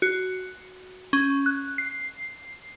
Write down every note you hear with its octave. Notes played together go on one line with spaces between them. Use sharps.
F#4
C#4
F#6
C7